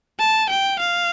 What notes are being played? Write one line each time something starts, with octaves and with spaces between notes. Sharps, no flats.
A5
G5
F5